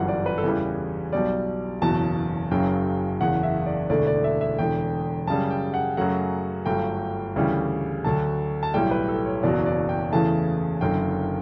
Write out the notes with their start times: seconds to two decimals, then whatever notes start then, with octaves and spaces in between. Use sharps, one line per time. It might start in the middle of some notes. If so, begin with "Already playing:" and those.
Already playing: G1 F#2 E3 G3 F#5
0.08 D5
0.26 B4
0.38 A4
0.44 E2 C#3 E3 G3 B4
1.12 B1 B2 G3 D5
1.82 F#1 E2 B2 F#3 A5
2.51 F#1 F#2 C#3 F#3 G5
3.20 F#1 E2 C#3 F#5
3.43 E5
3.66 D5
3.89 E1 D2 D3 A3 D5
4.07 D5
4.24 E5
4.41 E5
4.58 E1 E2 D3 G5
5.27 F#2 C#3 G3 A5
5.51 G5
5.74 F#5
5.97 F#2 C#3 F#3 A3 F#5
6.66 G1 G2 F#3 A3 G5
7.36 D2 C#3 E3 G3
8.04 D2 D3 F#3 A5
8.63 A5
8.74 B1 A2 G3 G5
8.91 B4
9.08 A4
9.26 C#5
9.43 F#1 E2 B2 F#3 D5
9.66 D5
9.89 G5
10.12 E2 C#3 E3 A3 A5
10.81 F#1 F#2 D3 G5